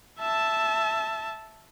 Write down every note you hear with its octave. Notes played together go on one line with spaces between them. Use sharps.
E5 A5